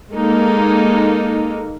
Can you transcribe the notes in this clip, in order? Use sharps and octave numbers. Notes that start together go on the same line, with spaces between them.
G#3 A#3 D#4 A4